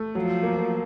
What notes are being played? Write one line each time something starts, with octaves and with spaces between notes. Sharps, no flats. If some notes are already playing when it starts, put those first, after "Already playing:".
Already playing: A3
F3 F#3
A#3